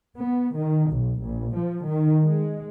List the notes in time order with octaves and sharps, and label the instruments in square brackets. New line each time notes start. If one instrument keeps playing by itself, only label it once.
[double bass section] B3
D#3
B1
A#1
F3
D#3
G#3